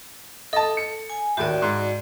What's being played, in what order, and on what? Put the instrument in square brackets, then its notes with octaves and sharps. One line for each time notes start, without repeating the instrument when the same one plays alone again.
[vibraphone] A4 [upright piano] D#5 A5
[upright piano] C#7
[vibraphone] G#5
[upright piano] D#2 A2 [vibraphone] F#4 D5
[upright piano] G#2